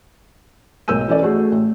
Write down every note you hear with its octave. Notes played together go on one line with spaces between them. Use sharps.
B1 G#2 A#4 E6 G6 D#7
E3 C#4 A4 D5
A3 F#4 G#4
A1